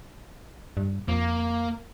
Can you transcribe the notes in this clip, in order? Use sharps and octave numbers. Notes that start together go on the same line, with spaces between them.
G2
F2 A#3